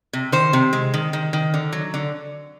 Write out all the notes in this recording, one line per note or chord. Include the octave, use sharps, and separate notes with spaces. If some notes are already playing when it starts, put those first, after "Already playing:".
C3
D#3 C5
C3
G#3
D#3
D#3
D#3
D3
F#3
D3